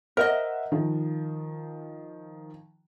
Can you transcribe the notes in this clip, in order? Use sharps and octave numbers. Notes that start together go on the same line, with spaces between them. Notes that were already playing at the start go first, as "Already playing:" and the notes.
A#4 C5 D#5 E5 F#5
D#3 F3